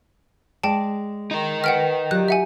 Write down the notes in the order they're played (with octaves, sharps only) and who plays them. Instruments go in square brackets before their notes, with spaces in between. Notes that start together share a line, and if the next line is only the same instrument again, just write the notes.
[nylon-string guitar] G#3 D5 [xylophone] G5 A5
[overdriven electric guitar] D#4 A#4
[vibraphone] B4 [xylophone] F#5 G5 F6
[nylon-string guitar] F#3 F4 D5 [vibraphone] G4 [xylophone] F#6
[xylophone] E5 F#5 G#5